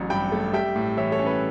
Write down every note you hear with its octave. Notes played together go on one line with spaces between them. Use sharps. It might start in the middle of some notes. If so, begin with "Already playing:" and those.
Already playing: A1 F#3 C#4
G2 G5 B5
A3
G3 E5 G5
A2
E3 C#5 E5
A4 C#5
C#4
B4